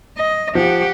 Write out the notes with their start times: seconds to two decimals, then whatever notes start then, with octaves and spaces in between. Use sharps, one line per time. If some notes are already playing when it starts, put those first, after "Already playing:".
0.18 D#5
0.55 F3 G4 F#5